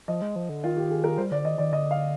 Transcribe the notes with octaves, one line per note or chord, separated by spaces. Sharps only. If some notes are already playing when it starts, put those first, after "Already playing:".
F3 D#5
G#3
F3
D3
D#3 F4
G4
G#4
A#4
G3 C5
D3 D5
D#3 D#5
D#3 D5
D3 D#5
F5